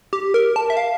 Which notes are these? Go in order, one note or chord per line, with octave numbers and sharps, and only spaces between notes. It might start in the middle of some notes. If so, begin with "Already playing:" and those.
G4
A#4
A5
E5
F5